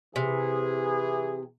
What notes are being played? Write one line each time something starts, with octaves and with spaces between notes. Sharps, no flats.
C3 E3 G#4